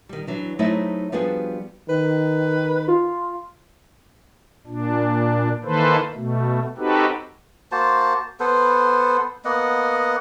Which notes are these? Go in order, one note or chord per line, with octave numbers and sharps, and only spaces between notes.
D#3 G3
E3 F#3 D4
F#3 A3 D#4 E4 G#4 C5
F3 G3 B3 D4 F#4 G#4
D#3 B4
F4
A#2 D4
D#3 E3 A#3 A4 B4 C5
B2 A3
C4 D#4 F#4 G4 A4 B4
A#3 F#4 C5 A5
B3 A4 B4 C5
A#3 B3 D#5 F#5